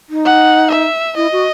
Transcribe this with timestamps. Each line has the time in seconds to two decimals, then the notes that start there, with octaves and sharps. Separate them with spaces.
0.10 D#4
0.25 F#5
0.71 E5
1.16 E4 D#5
1.32 F#4